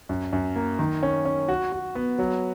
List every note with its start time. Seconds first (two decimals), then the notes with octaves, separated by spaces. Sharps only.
0.09 F#2
0.33 F#2
0.55 A#3
0.79 D#3
1.03 C#4
1.25 C#4
1.48 F#4
1.72 F#4
1.95 B3
2.18 F#3